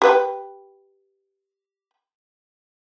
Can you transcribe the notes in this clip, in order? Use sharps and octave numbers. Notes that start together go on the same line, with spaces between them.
G4 B4 G5